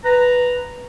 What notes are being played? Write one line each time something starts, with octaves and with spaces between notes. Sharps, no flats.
B4 A#5